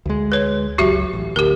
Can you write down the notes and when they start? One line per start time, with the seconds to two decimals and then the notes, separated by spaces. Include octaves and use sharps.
0.06 D2 G#3
0.32 B4 C#5
0.78 F#1 C#2 F#3 F#4 G4 E5
1.13 A1
1.36 D2 G4 A#4